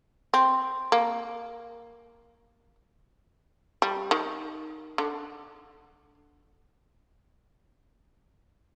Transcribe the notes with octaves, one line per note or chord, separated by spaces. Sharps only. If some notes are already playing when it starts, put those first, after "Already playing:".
C4
A#3
G3
D#3
D3